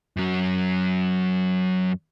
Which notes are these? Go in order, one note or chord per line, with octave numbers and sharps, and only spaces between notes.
F#2 F#3